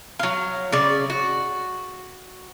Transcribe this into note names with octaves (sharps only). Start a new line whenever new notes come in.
F#3 F5
C#3 D5
F#4